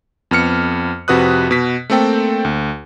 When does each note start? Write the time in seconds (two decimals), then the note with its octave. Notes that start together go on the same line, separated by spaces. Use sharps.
0.31 F2 B3 F6 C#7
1.08 F2 C3 F#4 B4 D#6 F#6
1.51 B2 B6
1.90 A3 A#3 C4 A4 G5
2.45 D2